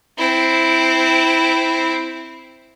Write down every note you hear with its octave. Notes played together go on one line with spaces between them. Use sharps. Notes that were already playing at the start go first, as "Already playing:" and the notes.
C4 E4